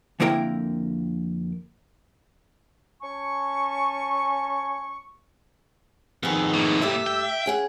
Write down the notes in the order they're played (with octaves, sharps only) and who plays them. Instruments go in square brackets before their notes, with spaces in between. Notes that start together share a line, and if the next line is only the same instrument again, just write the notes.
[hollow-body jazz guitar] F2 D3 A#3 E4 A#4 G5
[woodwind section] C#4 G#5 A5 C#6
[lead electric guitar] F2 D#3 [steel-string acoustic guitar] B3 G#4
[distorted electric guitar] A2 A#3
[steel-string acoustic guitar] G2 A3 G4 [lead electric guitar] E5
[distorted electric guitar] G5
[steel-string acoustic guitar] C#4 G#4 F#5